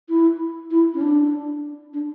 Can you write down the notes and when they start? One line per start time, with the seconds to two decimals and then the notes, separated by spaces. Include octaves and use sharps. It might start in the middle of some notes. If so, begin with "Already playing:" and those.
0.09 E4
0.71 E4
0.94 C#4
1.01 D4
1.93 D4